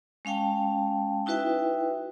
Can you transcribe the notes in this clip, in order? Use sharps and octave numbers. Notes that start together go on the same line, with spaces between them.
G#3 C#4 F5 G5 A5
D#4 E4 F#4 B4 E5 G5